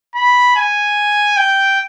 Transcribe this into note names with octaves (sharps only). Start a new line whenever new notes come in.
B5
G#5
G5